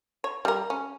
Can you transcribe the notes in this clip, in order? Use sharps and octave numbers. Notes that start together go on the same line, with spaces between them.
C#5
G3 A#4
C#4